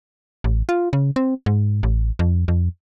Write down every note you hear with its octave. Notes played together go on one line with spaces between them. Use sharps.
A1
F4
C#3
C4
G#2
A1
F2
F2